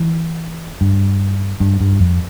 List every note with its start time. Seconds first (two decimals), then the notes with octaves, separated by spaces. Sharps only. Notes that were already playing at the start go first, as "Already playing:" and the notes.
Already playing: E3
0.81 G2
1.60 G2
1.81 G2
2.00 F2